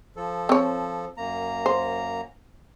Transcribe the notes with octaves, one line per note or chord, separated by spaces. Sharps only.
F3 A4
C4 C#5
F#2 A#3 A#5
C5